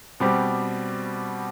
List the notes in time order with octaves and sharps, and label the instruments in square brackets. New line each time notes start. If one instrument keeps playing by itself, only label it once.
[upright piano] B2 G3 C4 G4